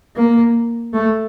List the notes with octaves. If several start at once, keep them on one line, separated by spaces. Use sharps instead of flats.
A#3
A3